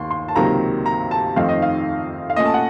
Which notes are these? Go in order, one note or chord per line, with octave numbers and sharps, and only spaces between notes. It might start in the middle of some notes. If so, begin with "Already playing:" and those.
Already playing: D#2 D#3 A#3 C6
C6
A5
C#2 C3 D#3 F#3 A#3 A#5
A#5
A5
F2 D#3 A3 C4 D#4 F5
D#5
F5
F5
A#2 A3 C#4 D#5
A5
F#5